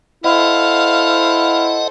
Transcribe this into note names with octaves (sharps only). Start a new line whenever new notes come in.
E4 A4 C5 D#5 F5 F#5